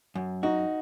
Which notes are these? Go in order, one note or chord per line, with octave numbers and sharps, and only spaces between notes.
F#2
D#4 F#4